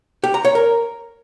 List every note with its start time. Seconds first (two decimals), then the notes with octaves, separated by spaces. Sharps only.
0.24 G4
0.34 A#5
0.45 C#5
0.55 A#4